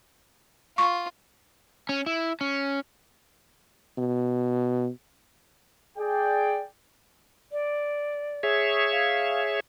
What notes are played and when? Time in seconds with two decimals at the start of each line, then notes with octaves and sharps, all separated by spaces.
0.78 F4 C#6
1.89 C#4
2.06 E4
2.41 C#4
3.97 B2
5.98 G#4 D5 G5
7.52 D5
8.43 G#4 C#5 E5
8.92 F5